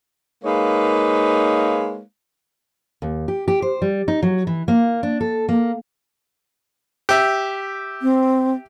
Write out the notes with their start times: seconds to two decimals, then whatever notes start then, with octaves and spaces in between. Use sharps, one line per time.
0.44 G#3 A#3 D#4 B4 C#5 F5
3.02 D#2
3.28 G4
3.48 G4
3.62 C5
3.82 G3
4.08 D#4
4.23 F#3
4.47 E3
4.68 A#3
5.03 D4
5.21 A4
5.49 A#3
7.09 G4 E5
8.02 C4